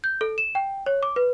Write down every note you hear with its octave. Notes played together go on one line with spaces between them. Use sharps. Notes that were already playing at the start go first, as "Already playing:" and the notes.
G6
A4
E7
G5
C#5
D6
B4